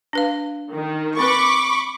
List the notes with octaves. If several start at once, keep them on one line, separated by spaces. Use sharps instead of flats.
D4 B4 F5
D#3
C4 B4 B5 C#6 D6